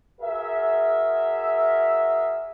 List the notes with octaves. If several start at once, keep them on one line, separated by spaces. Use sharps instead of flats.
F#4 G#4 A#4 E5